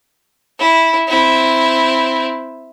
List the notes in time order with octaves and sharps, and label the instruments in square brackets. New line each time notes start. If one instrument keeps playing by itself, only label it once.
[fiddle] E4
C4 E4